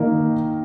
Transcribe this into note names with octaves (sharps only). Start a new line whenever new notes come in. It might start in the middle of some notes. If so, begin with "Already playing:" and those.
Already playing: D#3 A#3 D#4